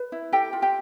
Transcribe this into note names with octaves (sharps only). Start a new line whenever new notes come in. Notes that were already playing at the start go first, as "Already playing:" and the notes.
Already playing: B4
E4
G4 A4 G5
F4
G4 G5